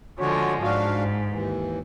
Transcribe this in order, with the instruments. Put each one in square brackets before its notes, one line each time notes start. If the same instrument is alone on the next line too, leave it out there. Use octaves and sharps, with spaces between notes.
[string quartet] D3 F3 G#3 [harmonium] F#4 C#5
[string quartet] G#2 [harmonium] D4 F#4 F5
[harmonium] D#2 E3